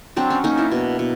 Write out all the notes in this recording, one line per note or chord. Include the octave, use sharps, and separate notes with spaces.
F#3 C4 D4
C#4
A#3 C#4 D#4
D4 E4
B2
B2